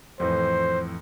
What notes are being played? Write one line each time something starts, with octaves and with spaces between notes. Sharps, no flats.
F2 A2 E3 C5